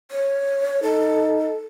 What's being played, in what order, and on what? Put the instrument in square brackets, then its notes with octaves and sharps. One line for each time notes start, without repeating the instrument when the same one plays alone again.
[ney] C#5
[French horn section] D#4 [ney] A4